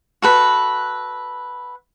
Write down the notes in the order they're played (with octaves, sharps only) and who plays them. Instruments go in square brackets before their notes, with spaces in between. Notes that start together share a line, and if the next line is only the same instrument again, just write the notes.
[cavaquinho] F#4 A4 B4